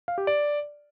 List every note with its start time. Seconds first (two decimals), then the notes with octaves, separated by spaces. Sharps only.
0.08 F5
0.18 G4
0.27 D5